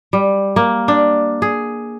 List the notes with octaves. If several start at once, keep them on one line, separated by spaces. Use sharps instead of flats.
G3
A#3
D4
G#4